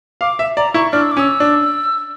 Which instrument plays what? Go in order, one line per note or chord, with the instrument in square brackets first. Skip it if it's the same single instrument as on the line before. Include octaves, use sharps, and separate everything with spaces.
[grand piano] F5 [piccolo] D6
[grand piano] E5
[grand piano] D5 [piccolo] A#5
[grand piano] E4 [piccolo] C#6
[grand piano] D4 [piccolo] F6
[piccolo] E6
D6
[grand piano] C#4
[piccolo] E6
[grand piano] D4